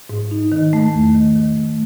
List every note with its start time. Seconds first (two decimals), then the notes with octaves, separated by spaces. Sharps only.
0.10 G#2
0.31 D#4
0.52 D#3
0.73 A3
0.93 E2
1.15 D#3
1.36 D#3
1.56 A3